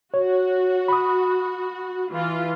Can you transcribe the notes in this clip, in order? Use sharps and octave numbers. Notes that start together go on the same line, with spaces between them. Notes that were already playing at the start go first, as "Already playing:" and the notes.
F#4 C#5
B5 D#6
E3 F4